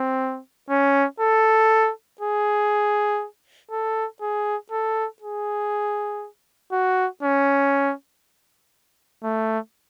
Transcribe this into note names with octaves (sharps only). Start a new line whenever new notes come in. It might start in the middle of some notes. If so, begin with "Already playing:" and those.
Already playing: C4
C#4
A4
G#4
A4
G#4
A4
G#4
F#4
C#4
A3